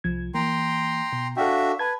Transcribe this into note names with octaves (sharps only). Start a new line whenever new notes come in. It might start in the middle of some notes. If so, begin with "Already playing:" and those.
C2 F3 G#6
E3 A#3 G5 A#5 C6
B2
D4 F#4 A4 E5 F5 G5
B4 A5 G#6